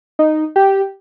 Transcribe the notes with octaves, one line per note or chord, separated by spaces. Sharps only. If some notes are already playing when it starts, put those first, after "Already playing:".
D#4
G4